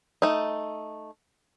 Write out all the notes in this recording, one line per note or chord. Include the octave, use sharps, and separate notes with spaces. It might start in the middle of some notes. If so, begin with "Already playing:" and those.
A3 D#4